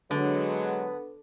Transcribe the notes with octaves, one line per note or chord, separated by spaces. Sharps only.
D3 F#3 G#3 B3